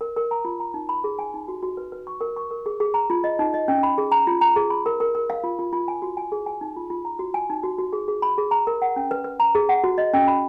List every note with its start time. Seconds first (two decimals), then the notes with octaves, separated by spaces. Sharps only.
0.01 A#4
0.17 A#4
0.31 A#5
0.45 F4
0.60 A#5
0.74 D#4
0.89 B5
1.04 G#4
1.19 G#5
1.34 D#4
1.48 F#4
1.62 F#4
1.77 B4
1.92 B4
2.07 C#6
2.21 A#4
2.36 C#6
2.51 A#4
2.66 G#4
2.80 G#4
2.94 A#5
3.10 F4
3.24 D#5
3.39 D#4
3.54 D#5
3.68 C#4
3.83 B5
3.98 G#4
4.12 A#5
4.27 F4
4.41 A#5
4.56 G#4
4.70 B5
4.86 A#4
5.00 A#4
5.15 A#4
5.30 F5
5.44 F4
5.59 F4
5.73 F4
5.88 G#5
6.02 F#4
6.17 G#5
6.32 G#4
6.46 G#5
6.61 D#4
6.76 F4
6.90 F4
7.05 A#5
7.19 F#4
7.34 G#5
7.50 D#4
7.63 F#4
7.78 F#4
7.93 G#4
8.08 G#4
8.22 B5
8.38 G#4
8.51 A#5
8.67 A#4
8.82 F#5
8.96 C#4
9.11 B4
9.24 B4
9.40 A#5
9.55 G#4
9.69 F#5
9.84 F#4
9.98 D#5
10.13 C#4
10.28 B5